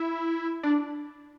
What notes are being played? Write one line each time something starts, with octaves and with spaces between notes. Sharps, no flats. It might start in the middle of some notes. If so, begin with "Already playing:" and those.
Already playing: E4
D4